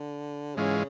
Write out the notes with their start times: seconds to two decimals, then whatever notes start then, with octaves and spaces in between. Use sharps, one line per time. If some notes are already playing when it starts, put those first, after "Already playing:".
Already playing: D3
0.56 G#2 C#3 E3 G#3 C#4 F4